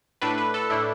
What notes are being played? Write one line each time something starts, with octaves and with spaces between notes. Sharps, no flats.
A2 A3 D4 B4
B4
A4
A2 A3 D4 E4